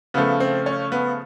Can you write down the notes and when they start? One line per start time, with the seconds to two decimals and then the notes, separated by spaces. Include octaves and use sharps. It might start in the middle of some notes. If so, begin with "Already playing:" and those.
0.14 C#3 F3 A3 B3
0.40 C4
0.66 C#4
0.92 B3